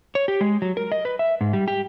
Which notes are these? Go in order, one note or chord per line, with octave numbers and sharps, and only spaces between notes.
C#5
G4
G#3
F#3
A#4
D#5
B4
E5
G#2
G3
G4